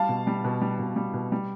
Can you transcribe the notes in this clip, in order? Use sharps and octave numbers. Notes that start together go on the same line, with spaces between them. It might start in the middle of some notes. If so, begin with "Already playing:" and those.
Already playing: G3 F5 A5
B2
G3
B2
G3
B2
G3
B2
G3